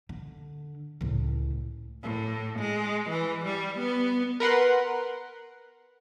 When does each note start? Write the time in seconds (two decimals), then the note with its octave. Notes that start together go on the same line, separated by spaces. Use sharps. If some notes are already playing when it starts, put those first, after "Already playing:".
0.09 D3
1.01 C#2 A2
2.03 A2
2.59 G#3
3.09 E3
3.44 G3
3.78 B3
4.40 A#4 B4 F#5 C6